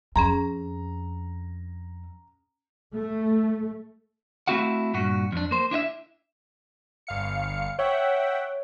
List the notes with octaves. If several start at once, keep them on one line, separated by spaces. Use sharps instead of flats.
F2 C#4 G#4 A#5 C6
A3
A3 C4 E4 F#4 F5 F#5
G2 A#2 F#4
F2 D4
A#3 C5
D4 E4 D#5 E5
G1 F5 C#7
C#5 E5 F#5 G5